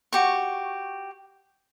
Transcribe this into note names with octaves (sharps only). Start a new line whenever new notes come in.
F#4 G4 C#6